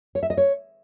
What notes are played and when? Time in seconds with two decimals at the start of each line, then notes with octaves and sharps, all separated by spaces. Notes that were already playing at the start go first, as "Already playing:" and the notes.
0.15 C#5
0.23 E5
0.30 D#5
0.37 C#5